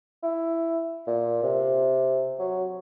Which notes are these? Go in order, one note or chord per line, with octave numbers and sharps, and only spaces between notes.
E4
A#2
C3
F#3